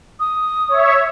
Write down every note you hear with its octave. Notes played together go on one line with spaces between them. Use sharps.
D#6
C#5 E5